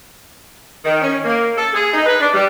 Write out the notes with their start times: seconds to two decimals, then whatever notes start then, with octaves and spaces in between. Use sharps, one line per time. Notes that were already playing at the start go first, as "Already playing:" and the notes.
0.85 D#3
1.02 C#4
1.25 A#3
1.56 A4
1.74 G#4
1.94 D#4
2.06 B4
2.20 D4
2.34 G3